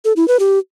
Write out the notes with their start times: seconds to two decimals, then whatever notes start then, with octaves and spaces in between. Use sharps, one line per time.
0.05 A4
0.16 E4
0.28 B4
0.39 G4